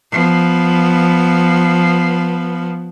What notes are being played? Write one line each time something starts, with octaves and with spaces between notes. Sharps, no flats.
F3 B3